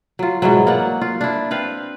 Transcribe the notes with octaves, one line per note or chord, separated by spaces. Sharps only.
F#3 F4
G#2 B2 E3 F#3
A#3 D5 F#5
F4
D4 E4
C4 B4 F5